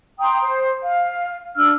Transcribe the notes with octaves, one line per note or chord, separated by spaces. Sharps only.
G5 A#5 C6 D#6
C5
F5
D4 E6 F6